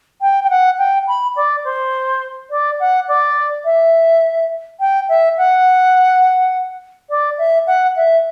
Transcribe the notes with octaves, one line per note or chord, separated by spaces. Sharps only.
G5
G5
F#5
G5
B5
D5
C5
D5
F#5
D5
E5
G5
E5
F#5
D5
E5
F#5
E5